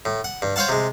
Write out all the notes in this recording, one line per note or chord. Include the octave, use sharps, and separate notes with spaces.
A2
F#5
G2
C5 C#5 F5 F#5 A5
C3 G#3